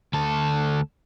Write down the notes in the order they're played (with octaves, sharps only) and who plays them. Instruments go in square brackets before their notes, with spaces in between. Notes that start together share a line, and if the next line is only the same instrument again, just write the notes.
[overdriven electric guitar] D2 A4